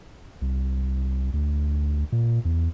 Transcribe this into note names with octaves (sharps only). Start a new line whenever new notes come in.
C2
D2
A#2
E2